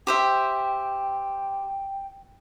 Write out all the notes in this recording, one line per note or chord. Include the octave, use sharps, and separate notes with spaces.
G4 C5 E5 G5